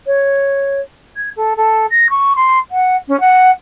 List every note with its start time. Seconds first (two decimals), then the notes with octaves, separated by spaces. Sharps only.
0.07 C#5
1.17 G#6
1.36 A4
1.57 A4
1.91 A#6
2.10 C#6
2.36 C6
2.71 F#5
3.08 C#4
3.20 F#5